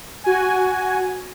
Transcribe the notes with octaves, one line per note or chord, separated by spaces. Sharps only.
F#4 G#5